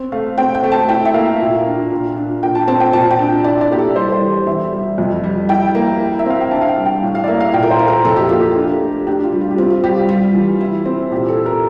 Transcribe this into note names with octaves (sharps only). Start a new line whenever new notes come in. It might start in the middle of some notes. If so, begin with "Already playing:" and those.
Already playing: C4
A3 F5
C4 G5
G5
A3
A5
E4 G5
E5
A#3 F5
A#2
D4
A#2
D4
A#2 G5
A5
C4 A5
G5
A#2 A5
G5
D4
E4 D5
D5
A#3 G4
A4
G3 C5
C5
E3
E2 E5
G3
F2
G3
E4 G5
A#3
E4
E5
C4 F5
G5
D4 A5
F5
G5
G3
G5
A2
F5
D5
A#3 E5
F5
A#2 G5
A#4
C5
E4
A#4
F2 A4
G4
A#3 F4
G4
D4
A3
D4 G4
F4
G3
F4
G4
C4 F4
F4
G3 G4
F4
G3 F4
E3
E4
C4
A#2 G4
A4
E4
A#4